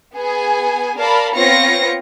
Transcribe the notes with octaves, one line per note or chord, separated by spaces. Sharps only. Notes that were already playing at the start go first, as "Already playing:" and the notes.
B3 G#4 G#5
A#4 D5 F5 A5 B5
B3 C4 F4 C#5 A#6 C#7